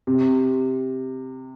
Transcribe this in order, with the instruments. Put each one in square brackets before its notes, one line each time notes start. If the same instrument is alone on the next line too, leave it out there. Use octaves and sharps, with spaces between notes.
[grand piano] C3